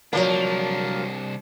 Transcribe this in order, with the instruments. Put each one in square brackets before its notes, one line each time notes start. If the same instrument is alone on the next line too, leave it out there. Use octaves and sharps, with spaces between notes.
[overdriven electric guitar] C2 D4 [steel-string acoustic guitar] D3 F#3 [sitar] F3 A#3